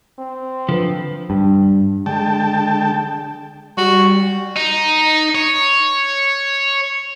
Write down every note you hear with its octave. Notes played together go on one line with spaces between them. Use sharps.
C4
D3 F3 B4
G2
D3 G#3 G5 A5
G3 F#4
D#4
C#5